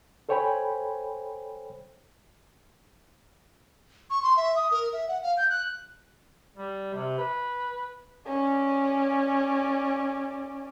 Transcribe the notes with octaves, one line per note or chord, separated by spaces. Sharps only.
A4 C5 C#5 G5 G#5 B5
C#6
C6
E5
D#6
A#4
E5
F#5
F5
G6
F#6
G3
C3
B4
C#4 D5